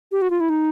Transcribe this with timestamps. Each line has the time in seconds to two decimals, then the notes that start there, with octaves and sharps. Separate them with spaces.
0.12 G4
0.22 F#4
0.30 F4
0.40 E4
0.50 D#4